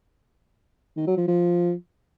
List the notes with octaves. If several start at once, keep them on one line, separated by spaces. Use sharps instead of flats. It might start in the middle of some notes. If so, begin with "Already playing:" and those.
D#3
F#3
F3
F3